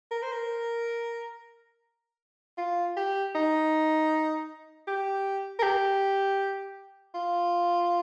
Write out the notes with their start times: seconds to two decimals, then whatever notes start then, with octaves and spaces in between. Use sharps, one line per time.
0.11 A#4
0.22 C5
0.32 A#4
2.58 F4
2.97 G4
3.35 D#4
4.87 G4
5.59 A#4
5.63 G4
7.15 F4